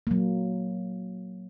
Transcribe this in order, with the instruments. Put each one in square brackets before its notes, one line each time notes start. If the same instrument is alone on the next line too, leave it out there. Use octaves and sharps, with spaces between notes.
[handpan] F#3 A#3